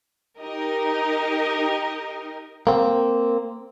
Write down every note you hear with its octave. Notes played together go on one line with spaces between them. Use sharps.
D#4 G4 A#4 D#5
A#3 C4